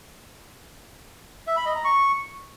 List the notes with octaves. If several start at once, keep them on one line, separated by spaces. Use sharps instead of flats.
E5
B5
D#5
A#5
C#6